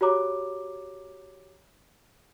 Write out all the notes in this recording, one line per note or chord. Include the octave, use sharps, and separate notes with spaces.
F#4 G4 C#5 A#5 D6